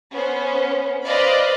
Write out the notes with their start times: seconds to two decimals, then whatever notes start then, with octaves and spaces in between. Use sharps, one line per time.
0.12 B3 C#4 C5
1.06 B4 C5 D5 D#5 F5 B5